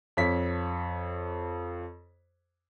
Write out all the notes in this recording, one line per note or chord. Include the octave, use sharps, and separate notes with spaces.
F2 C#5 B6